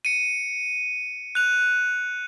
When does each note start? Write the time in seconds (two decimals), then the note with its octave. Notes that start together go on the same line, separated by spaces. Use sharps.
0.05 C#7 D#7
1.35 F#6 F7